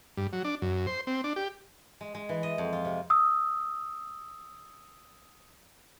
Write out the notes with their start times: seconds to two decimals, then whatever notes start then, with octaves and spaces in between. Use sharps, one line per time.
0.17 G2
0.33 F#3
0.44 D4
0.62 F#2
0.87 C5
1.07 C4
1.24 D4
1.36 G4
2.01 G#3
2.15 G#3
2.29 E3
2.43 D#5
2.58 F2
2.73 F4
2.85 C3
3.10 D#6 E6